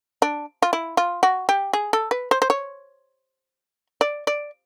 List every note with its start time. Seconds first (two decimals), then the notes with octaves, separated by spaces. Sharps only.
0.22 D4
0.62 F4
0.73 E4
0.97 F4
1.23 F#4
1.49 G4
1.73 G#4
1.93 A4
2.11 B4
2.31 C5
2.42 C5
2.50 C#5
4.01 D5
4.27 D5